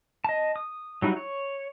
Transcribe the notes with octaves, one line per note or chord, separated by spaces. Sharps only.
D#5 A5
D#6
F#3 G3 D#4 E4 F#4
C#5